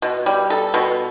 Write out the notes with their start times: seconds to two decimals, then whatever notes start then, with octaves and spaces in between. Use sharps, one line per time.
0.02 B2
0.26 G3
0.50 A4
0.74 B2